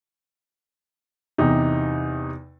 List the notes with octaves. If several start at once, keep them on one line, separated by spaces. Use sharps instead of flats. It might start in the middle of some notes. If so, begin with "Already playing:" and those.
E2 C3 D#4